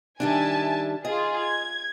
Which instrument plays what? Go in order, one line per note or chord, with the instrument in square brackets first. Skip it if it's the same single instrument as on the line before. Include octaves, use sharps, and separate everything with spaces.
[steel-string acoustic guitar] D#3 G3 D4 [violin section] E5 G#5 A5
[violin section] F4 G#4 [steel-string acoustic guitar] D#5
[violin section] G#6